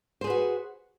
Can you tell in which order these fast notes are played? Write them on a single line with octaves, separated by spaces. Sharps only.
C5 G#4 B4 F#4